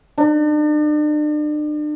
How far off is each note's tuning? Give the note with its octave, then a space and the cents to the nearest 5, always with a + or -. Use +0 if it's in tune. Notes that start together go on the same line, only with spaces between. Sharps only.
D4 +40